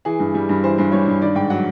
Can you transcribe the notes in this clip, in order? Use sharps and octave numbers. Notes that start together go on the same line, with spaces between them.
E3 G#4
G2
G3
G2
E3 C5
G2 C5
G3 C#5
G2
D#3 D5
G#2 G5
F#3 F#5